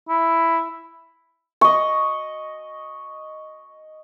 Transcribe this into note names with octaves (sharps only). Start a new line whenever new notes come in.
E4
D#5 C#6